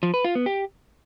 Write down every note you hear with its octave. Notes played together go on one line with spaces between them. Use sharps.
F3
B4
F4
B3
G4